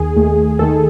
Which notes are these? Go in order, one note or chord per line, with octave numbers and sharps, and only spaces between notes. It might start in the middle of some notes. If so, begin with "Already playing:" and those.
Already playing: D#2 D#3 G#4
D#2 D#3 A3
D#2 D#3 A3 A4